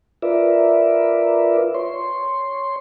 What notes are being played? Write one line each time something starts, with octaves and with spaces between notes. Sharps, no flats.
F4 A#4 B4 D5 E5
C#5 C6